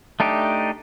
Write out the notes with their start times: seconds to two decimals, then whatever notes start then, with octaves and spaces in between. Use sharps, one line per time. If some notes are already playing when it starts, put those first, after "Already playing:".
0.20 A3 D4 D#4 G4